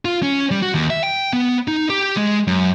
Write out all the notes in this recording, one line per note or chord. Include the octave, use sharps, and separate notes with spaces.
F4
C#4
G3
F#4
D#2
E5
G5
B3
D#4
G4
G#3
F#2